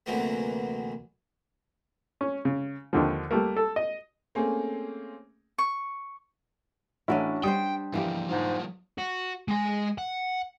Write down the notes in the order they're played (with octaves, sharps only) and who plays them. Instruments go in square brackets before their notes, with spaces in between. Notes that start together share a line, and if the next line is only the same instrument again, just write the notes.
[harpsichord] D2 C3 E3 F#3 A#3 B3
[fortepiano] C#4
C#3
D#2 D3 F3
G3 A3 A#3
A4
D#5
[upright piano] A3 A#3 C4 C#4 G#4
[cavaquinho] C#6
[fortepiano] A1 E4 [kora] C#4 D4 F#4
[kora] G3 D4 C5 [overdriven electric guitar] G5 [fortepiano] D#6
[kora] E3 A#3 G4 [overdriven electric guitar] F3 B3
[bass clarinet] G#2 [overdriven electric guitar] F#3 F4
[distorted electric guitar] F#4
G#3 G#5
F#5